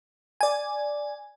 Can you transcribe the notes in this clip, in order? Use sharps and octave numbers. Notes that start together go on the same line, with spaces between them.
D5 G#5